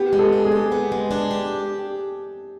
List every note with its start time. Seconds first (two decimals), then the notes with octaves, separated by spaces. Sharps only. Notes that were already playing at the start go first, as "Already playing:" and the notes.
Already playing: B3 G4
0.13 G#3
0.19 A4
0.32 D4
0.45 G#4
0.52 G4
0.72 B3
0.92 G#3
1.11 D4
1.31 G4